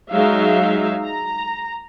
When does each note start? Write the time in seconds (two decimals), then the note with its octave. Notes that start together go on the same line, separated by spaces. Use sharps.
0.11 F#3 G#3 D#4 E5 F5
1.05 A#5